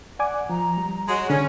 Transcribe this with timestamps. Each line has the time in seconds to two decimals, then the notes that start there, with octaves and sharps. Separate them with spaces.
0.19 D5 F#5 G#5 D6
0.50 F3 A#5
0.77 G3
1.09 G#3 F#4 C#5
1.30 D3 C#4